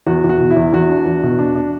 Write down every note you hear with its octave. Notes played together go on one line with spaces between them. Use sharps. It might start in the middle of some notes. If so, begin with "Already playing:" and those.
E2 F#4
E2
F#4
B2
E4
E2
E2 F#4
D4
E2
B2
D4
D4